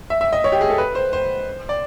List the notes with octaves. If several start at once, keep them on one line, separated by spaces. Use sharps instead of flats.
E5
E5
D#5
C#5
G4
G#4
A4
B4
C5
C5
D5